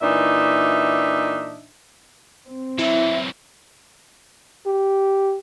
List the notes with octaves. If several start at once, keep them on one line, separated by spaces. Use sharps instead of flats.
A#2 E3 D4 D#4 E5
C4
E3 F#3 E4 E5
G4